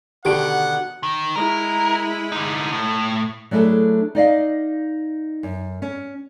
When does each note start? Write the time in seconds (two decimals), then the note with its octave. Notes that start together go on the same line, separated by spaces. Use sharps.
0.25 B2 D3 D#3 G4 F#5 D7
1.03 D#3
1.36 G#3 E4 A#4
2.32 D3 D#4
2.72 A2
3.51 F#3 A3 D4 E4 G#4 A4
4.15 D#4 D5 D#5 F5
5.43 F#2
5.82 C#4